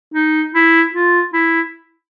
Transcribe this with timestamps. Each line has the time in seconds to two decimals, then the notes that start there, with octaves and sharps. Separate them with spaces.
0.14 D#4
0.55 E4
0.93 F4
1.33 E4